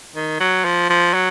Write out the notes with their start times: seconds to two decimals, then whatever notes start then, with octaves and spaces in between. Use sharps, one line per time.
0.15 D#3
0.40 F#3
0.65 F3
0.90 F3
1.14 F#3